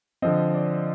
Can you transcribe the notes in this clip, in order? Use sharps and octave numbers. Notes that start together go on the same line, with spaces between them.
D3 F3 C4 D#5
D5